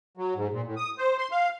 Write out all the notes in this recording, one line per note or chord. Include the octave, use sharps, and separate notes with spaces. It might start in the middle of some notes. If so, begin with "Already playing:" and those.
F#3
G#2
A#2
A2
D#6
C5
C6
F5